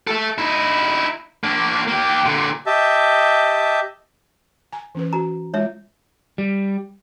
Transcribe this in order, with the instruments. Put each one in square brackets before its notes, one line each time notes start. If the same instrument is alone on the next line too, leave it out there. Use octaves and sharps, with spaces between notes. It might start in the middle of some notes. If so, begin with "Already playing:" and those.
[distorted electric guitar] A4 E5
D#4 E4
A#3 D4
A#3 G4
A#2 D3
[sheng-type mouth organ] G4 D#5 E5 A5
[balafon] G#5 A#5
E3 C#4 B4
[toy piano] F#4 A#5
[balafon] G#3 F4 [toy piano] C#5 E5
[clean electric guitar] G3